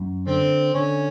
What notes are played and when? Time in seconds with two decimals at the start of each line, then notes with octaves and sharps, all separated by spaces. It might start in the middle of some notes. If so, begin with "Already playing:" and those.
Already playing: F#2
0.27 D3 C4
0.74 D3 C#4